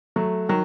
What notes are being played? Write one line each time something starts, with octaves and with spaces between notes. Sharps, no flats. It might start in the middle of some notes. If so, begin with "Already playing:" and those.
F#3 A3
D#3 F#3